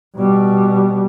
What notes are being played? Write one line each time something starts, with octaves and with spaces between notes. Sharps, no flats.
B2 G3